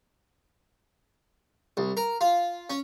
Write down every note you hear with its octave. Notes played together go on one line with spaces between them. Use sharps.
C2
A#4
F4
C#4